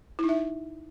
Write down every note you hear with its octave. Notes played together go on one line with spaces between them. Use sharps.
E4
D#4
E5